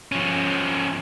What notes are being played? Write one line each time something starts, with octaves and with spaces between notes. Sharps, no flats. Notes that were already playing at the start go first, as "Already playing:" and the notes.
F3 C#4